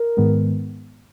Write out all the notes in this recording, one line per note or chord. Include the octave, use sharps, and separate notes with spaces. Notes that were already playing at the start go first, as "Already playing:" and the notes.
Already playing: A#4
G#2 D#3 G#3 B3